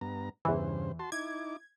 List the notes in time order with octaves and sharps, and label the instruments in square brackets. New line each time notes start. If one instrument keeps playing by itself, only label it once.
[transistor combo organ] G2 B3 A#5
[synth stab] E2 E3 [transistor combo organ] G2 C#3 C5
[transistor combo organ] F#4 A5 C6
[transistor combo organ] D#4 E4 D6 [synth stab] G#6